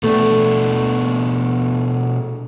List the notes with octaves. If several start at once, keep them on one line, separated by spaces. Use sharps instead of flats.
B2 A3 B3 D4